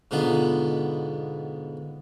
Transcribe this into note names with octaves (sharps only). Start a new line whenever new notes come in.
G#2 B2 D3 B3 F4